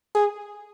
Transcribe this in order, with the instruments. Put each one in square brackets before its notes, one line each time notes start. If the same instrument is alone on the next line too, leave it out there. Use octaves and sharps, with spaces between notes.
[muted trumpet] G#4